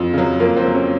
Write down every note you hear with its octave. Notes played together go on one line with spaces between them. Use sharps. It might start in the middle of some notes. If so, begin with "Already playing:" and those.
Already playing: F2 C4
C#3 F#3
F2 A#3
C4
C#3 F#3
C#4